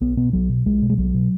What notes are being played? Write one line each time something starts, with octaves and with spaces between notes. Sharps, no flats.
B1 B3
B2 B3
B1 F#3
B2
B1 G#3
B2
G#3
B1 F#3
B2